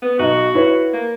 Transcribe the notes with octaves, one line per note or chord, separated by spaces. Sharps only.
B3
B1 D#4 F#4
E4 B4 C#5
A#3